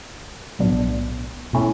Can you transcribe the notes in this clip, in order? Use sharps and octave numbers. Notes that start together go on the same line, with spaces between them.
B1 A2 F#3 B3 D4
B2 A3 C#4 E4